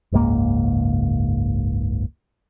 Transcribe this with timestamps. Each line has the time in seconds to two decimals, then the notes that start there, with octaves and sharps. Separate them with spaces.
0.12 F#1 C#2 G#2 A#3